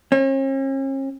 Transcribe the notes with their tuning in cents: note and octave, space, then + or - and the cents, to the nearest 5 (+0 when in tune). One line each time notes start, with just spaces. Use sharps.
C#4 -45